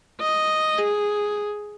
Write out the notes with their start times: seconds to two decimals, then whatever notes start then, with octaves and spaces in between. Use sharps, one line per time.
0.22 D#5
0.79 G#4